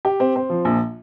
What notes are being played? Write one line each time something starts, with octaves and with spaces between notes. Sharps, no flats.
G4
C4
C4
F3
A#1